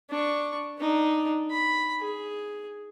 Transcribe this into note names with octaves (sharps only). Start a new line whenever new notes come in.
D4 C#6
D4 D#4
B5
G#4